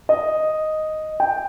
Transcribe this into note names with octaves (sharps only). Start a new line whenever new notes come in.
D#5
G5